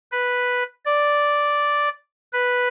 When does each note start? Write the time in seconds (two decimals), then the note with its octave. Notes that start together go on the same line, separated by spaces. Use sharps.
0.11 B4
0.85 D5
2.33 B4